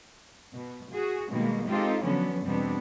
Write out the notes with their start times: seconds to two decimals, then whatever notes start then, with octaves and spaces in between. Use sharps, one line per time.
0.55 B2
0.93 F#4 G#4
1.30 B2 D#3 G3 G#3 A#3
1.68 G#3 C4 D#4 F4 G4 A4
2.03 D3 F3 F#3 B3 C#4 D4
2.46 E2 B2 G3 B3 C4 D4